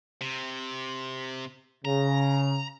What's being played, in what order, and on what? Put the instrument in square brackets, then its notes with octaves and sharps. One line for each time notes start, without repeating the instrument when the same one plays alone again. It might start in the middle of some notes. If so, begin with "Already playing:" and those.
[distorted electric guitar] C3
[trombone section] C#3 [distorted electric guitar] A#5